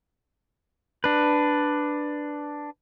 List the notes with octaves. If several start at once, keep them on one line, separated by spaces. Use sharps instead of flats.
D4 B4